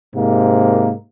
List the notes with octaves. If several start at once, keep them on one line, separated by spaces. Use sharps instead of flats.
G#2 C3 A#3